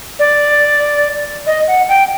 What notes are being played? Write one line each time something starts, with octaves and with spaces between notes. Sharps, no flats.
D5
D#5
F#5
G5